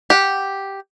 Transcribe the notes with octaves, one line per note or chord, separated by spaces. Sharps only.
G4 F#5